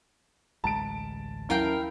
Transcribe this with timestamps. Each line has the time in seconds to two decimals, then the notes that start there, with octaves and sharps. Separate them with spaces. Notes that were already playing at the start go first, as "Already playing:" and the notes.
0.64 A1 D2 G#3 A5 D7
1.50 D#2 F#3 C#4 E4 A#4 F5 G5